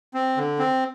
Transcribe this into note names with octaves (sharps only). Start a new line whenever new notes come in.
C4
D3
C4